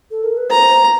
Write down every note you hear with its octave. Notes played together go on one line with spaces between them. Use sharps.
A4
A#4
B4
C5 A#5